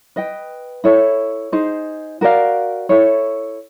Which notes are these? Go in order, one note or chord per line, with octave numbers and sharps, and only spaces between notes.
B4 D#5 G5
E4 A4 C#5
D#4 G#4 C5
F#4 A#4 D5 F5
E4 A4 C#5